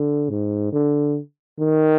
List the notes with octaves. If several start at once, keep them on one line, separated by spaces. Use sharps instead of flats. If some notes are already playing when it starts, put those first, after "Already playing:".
Already playing: D3
G#2
D3
D#3